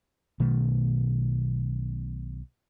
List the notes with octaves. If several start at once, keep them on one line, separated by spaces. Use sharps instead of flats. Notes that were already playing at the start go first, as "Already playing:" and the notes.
B1 B2 D#3 A3